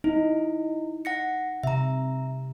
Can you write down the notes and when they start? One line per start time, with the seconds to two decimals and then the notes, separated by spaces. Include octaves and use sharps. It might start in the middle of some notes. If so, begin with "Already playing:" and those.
0.04 D#4 E4
1.05 F#5 A#6 C#7
1.63 C3 E5 A#5